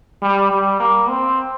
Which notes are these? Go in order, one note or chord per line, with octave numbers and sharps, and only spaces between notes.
G3
G3
A#3
C4